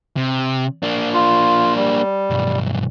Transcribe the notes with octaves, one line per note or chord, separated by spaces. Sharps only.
C3
A#3 D4
F4
G3
B1 G2